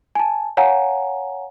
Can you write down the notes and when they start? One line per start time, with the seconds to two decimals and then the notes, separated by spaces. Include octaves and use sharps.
0.15 G#5 A5
0.57 C#5 F5 F#5 G#5 A#5